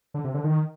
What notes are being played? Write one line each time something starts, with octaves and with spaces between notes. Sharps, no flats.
D3
C3
D3
D#3